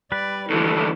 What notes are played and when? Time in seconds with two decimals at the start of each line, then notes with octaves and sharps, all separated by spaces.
0.12 G3 B4 D5
0.50 D#2 D3 E3 E4 A4